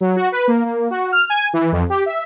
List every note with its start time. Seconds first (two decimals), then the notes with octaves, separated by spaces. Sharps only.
0.01 F#3
0.16 F#4
0.32 B4
0.48 A#3
0.65 A#3
0.91 F#4
1.12 F6
1.30 G#5
1.53 E3
1.72 F2
1.90 G4
2.06 E5